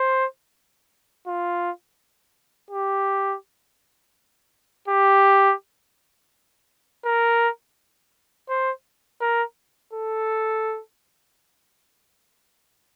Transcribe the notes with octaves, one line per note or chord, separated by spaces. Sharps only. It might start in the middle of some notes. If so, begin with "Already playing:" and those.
Already playing: C5
F4
G4
G4
A#4
C5
A#4
A4